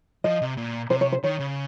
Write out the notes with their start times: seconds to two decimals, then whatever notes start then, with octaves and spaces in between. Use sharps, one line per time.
0.24 F3 D#5
0.42 C3
0.57 A#2
0.90 C3 C5
1.01 C#5
1.12 C5
1.23 D#3 C#5
1.40 C#3